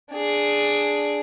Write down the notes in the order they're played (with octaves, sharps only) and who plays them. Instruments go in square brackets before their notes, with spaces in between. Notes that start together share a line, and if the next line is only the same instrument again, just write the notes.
[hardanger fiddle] D4 G#4